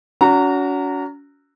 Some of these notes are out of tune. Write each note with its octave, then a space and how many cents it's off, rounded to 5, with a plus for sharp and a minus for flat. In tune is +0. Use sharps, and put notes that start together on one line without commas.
C#4 +40 F#4 +0 A#5 -20